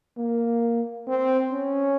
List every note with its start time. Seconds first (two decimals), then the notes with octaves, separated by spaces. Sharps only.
0.17 A#3
1.07 C4
1.52 C#4